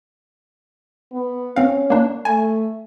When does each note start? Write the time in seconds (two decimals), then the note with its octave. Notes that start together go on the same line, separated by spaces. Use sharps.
1.12 B3
1.56 C4 C#4 F5
1.90 A#3 D4
2.25 A3 G#5